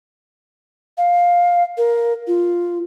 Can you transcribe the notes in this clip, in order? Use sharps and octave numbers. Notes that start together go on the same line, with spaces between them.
F5
A#4
F4